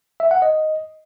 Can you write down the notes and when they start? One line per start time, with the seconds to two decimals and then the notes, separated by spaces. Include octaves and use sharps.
0.20 E5
0.31 F#5
0.42 D#5